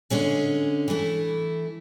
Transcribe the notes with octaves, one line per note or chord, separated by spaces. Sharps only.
D3 G#3 C#4 G#4
E3 A3 E4